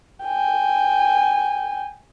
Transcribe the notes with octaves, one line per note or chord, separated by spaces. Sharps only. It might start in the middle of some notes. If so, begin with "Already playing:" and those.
G5 G#5